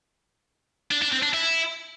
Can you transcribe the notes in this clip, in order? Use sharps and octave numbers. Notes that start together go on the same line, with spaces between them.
D4
D4
C4
D4
E4